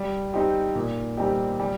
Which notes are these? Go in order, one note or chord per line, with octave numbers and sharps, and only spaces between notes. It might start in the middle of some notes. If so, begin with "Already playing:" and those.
Already playing: G3
C4 D#4 G4 C5
A#2
G3 C4 D#4 G4
G3